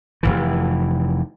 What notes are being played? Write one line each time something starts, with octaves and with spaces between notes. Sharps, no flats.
F1 C#2 E3